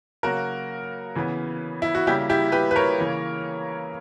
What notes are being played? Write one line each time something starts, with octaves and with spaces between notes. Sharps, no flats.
C#3 F#3 A#3 F#4 A#4
C#3 E3 B3
E4
F#4
C#3 G3 A#3 E4 G4
E4 G4
G4 B4
B4
A#4 C#5
C#3 E3 A#3